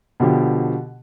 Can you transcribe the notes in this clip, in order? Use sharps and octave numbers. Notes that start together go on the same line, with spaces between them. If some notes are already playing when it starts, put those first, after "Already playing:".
B2 D3 F3 G4